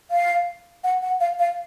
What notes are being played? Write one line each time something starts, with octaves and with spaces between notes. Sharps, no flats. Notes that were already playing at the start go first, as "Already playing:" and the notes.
F5
F#5
F#5
F5
F5